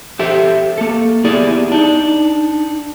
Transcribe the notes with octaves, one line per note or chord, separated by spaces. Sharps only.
G4 A4 C5 E5
A#3 A4
B3 E4 G4 G#4 D5 E5
D4 D#4